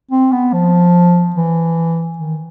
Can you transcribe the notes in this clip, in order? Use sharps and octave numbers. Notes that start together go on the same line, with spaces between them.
C4
B3
F3
E3
D#3